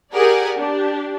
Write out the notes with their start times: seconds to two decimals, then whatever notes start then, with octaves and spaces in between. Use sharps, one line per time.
0.13 G4 G#4 A#4 D5 F#5 G#5
0.57 D4 G4